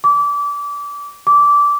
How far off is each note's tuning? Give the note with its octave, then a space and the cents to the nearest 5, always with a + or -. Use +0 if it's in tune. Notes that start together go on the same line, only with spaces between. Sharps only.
D6 -25
D6 -15